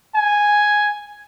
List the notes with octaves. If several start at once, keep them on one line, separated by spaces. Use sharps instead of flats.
G#5